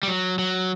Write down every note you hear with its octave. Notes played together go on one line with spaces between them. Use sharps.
G3
F#3
F#3